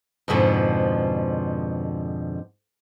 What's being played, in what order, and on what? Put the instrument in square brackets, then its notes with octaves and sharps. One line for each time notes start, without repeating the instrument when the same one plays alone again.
[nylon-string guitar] F2 G#2 B2 D3 F3